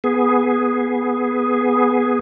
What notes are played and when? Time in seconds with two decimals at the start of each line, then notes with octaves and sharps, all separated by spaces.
0.04 B3 G#4